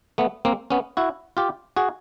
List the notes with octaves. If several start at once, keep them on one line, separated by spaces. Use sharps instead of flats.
A3 B3
A#3 C4
B3 C#4
E4 F#4
F4 G4
F#4 G#4